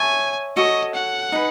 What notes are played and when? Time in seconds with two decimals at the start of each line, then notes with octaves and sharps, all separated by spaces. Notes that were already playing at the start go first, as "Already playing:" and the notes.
Already playing: C#5 E5 G#5 A5
0.57 F#4 A4 C#5 D#5
0.94 F#5
1.32 D#4 G#4 B4